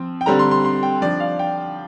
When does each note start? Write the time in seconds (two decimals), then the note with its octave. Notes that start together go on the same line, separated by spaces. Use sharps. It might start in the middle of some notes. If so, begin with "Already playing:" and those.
Already playing: F3 C4
0.21 G5
0.26 D3 G3 C4 A#5
0.39 C6
0.51 C6
0.65 C6
0.83 G5
1.02 F3 D4 D5
1.20 F5
1.39 G5